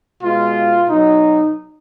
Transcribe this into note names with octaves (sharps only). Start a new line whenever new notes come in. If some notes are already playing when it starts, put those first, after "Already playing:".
B2 G#3 F4
B2 F#3 D#4